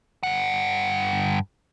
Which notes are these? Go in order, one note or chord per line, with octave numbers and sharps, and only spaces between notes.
G2 F#5